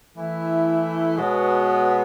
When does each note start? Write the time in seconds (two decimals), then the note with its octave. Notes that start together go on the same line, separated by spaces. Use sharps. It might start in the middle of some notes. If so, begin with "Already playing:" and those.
0.17 E3 A3 E4
1.17 B2 G#3 B3 F#4 C#5